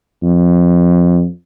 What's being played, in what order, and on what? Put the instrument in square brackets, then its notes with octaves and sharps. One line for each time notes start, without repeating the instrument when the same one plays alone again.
[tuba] F2